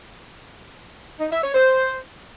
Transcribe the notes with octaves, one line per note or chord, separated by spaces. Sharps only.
D#4
E5
C#5
C5